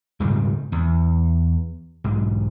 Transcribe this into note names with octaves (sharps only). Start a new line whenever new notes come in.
D#1 G#2 C#3 G3
E2
B1 G#2